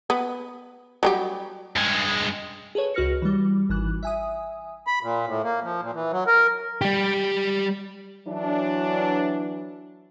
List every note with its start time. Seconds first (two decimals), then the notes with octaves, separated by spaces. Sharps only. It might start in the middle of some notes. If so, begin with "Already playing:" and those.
0.10 B3
1.03 F#3 G3 G4
1.76 G2 G#3
2.75 G#4 A4 B4 C#5
2.94 C#2 F#4 B4 F6 A#6 C#7
3.22 E3 G3
3.70 G#1 E3 F#6
4.03 E5 G#5 D#6
4.87 B5
5.03 A#2
5.27 A2
5.44 A#3
5.64 F3
5.82 A#2
5.95 E3
6.12 F#3
6.27 A#4
6.81 G3 G4
8.28 E3 F#3 D4